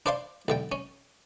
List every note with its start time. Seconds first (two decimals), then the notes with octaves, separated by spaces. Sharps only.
0.06 D4 C5 D5 F5 C6
0.48 B1 D3 G5
0.72 C#4